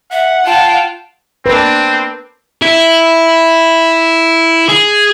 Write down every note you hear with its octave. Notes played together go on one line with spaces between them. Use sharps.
E5 F#5
F4 G5 A5
A#3 C4 D4 B4
E4
G#4